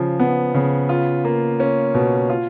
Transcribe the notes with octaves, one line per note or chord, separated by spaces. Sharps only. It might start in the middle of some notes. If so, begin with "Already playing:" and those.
Already playing: C#3 F3
B3
C#3
F4
A#3
C#4
B2
F4